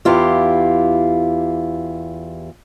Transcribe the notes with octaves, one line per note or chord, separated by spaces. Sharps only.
E2 E4 F4 G4